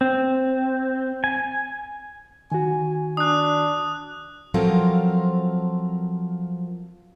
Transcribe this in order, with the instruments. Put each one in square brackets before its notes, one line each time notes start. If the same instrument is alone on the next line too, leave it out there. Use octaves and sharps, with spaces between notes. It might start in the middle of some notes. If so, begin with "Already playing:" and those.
[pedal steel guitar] C4
G#5
[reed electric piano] D#3 F#4 [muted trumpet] G#5
[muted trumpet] D4 [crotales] D#6 F#6
[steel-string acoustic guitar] F3 F#3 C4 F4 A4 A#4